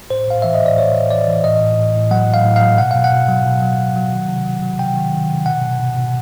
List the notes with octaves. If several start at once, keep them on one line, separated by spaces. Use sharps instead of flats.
A2 C5
A2 F5
E3 E5
D#5
A2 D5
A2 C#5
A2
E3 D5
E3
A2 D#5
A2
A2
A2
F#3 F#5
A2
F5
A2
F5
F#3
B2 F#5
B2 F5
F#5
B2
F#3
B2
F#3
B2
F#3
D#3
C3
F#3
F#3
C3 G5
D#3
D#3
C3
B2 F#5
B2
B2
B2